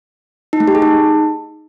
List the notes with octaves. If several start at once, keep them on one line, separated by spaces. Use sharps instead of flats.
D#4
A3
G4
G#4
D#4